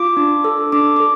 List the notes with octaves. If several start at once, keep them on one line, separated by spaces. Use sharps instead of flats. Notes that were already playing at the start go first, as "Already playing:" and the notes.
Already playing: F4 D6
D4
A4
D4 D6
A4 D6